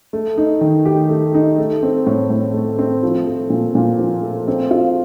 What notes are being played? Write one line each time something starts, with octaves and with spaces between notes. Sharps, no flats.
A3
D#4
D#3
G4
A3
D#4
A3
C4
A2
A2
A3
C4
F3
A3
A#2
A#2
F3
A3
C4
F4